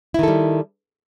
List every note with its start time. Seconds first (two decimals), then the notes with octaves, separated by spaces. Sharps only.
0.14 E4
0.19 D#3
0.23 A4
0.28 G3